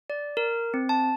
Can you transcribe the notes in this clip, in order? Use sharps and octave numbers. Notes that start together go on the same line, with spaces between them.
D5
A#4
C4
A5